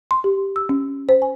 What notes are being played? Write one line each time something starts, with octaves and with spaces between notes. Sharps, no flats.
C6
G4
E6
C#4
C5
G#5